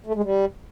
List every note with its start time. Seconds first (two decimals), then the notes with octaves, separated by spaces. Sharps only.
0.06 A3
0.15 G#3
0.23 G3